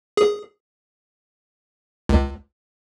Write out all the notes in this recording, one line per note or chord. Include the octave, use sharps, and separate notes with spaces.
G#4
C#2